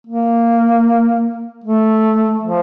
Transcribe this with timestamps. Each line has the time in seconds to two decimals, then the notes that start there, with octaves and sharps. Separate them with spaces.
0.07 A#3
1.64 A3
2.43 F3